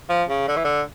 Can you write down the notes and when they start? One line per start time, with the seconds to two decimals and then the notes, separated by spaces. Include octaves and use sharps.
0.09 F3
0.30 C#3
0.48 D3
0.56 E3
0.65 D3